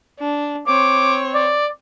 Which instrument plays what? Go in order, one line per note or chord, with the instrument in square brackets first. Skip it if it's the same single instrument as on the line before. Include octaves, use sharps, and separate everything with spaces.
[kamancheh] D4
[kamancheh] C4 C#5 [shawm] D6
[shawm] D5